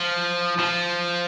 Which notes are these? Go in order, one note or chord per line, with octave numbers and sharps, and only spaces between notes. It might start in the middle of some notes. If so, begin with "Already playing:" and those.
Already playing: F3
F3